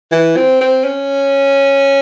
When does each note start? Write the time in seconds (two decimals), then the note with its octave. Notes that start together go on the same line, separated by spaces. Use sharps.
0.12 E3
0.36 C4
0.61 C4
0.84 C#4